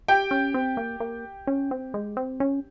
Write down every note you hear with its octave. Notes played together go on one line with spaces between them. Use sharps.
G4 G5
C#4
C4
A#3
A#3
C#4
C4
G#3
C4
C#4